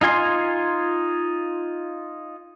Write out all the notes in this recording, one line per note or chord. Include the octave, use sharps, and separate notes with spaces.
D#4 F4 G#5 C6